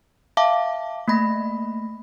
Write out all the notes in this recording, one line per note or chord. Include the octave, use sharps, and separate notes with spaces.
E5 F5 A5 D6
A3 A#3 B5 A#6